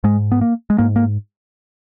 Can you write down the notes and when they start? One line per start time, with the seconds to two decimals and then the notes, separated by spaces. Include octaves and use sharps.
0.04 G#2 G#3
0.32 B3
0.41 A#3
0.70 G#3
0.78 G#2 A#3
0.96 A#3